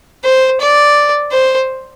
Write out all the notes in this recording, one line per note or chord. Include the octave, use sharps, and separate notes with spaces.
C5
D5
C5